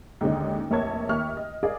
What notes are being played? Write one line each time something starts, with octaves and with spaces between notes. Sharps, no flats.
D#2 G#2 D3 C#4 D#4
F1 A#1 A#3 C#5 A5 G#6
D#2 A#3 E5 C#6 F6
D#5
G#4 A#4 D5 D#5 F5